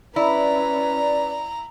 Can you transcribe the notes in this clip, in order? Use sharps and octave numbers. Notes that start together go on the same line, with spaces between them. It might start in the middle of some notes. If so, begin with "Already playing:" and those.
C#4 E4 B4 D5 A#5